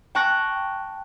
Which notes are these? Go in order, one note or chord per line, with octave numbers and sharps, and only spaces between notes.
G5 A5 C#6 F#6 A#6